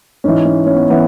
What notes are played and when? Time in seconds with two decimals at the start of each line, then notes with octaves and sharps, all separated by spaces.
0.24 G#2 E3 C#4
0.45 C#4
0.66 C#4
0.75 B3
0.90 E3 B3